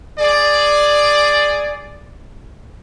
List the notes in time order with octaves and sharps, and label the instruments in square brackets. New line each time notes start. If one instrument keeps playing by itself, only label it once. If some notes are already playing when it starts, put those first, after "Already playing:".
[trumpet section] G#4 D5